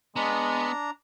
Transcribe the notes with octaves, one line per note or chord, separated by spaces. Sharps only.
G#3 B3 D4 A#5